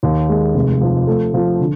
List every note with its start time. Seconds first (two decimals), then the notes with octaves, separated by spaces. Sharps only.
0.03 D#2
0.29 G#3
0.54 F1
0.81 F3
1.07 A3
1.34 F3
1.60 D3